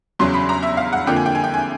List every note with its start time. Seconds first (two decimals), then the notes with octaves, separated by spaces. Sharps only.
0.19 E2 C#3 F#3 C6
0.34 B5
0.49 A#5
0.63 E5
0.77 F5
0.93 F#5
1.06 F2 D3 F3 A#3 G5
1.16 G#5
1.26 G5
1.35 G#5
1.44 G5
1.54 G#5